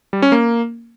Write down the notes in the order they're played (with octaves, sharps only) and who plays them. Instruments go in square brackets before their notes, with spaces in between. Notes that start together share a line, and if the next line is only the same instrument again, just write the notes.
[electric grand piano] G3
C#4
A#3